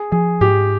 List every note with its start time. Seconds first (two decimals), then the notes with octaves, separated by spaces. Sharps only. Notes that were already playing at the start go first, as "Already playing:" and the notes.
Already playing: G#4
0.12 F3 G#4
0.41 G#2 G4